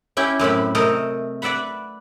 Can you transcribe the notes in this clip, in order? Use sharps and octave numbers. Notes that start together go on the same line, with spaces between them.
C#4 E4 G4
F#2 A2 C4 B5
C3 A3 A4 A#4 D#5
B4 D5 E5 F#5 B5